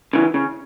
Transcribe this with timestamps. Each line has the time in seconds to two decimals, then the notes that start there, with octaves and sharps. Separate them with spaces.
0.13 C#3 E3
0.34 C#3